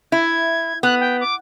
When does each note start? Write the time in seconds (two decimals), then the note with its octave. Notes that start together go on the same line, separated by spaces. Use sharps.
0.12 E4 G#6
0.83 B3 F#6
1.00 G5
1.20 D6